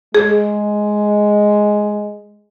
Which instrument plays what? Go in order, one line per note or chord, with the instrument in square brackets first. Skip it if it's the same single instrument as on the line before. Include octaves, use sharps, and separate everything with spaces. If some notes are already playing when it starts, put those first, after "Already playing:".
[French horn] G#3 [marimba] G#4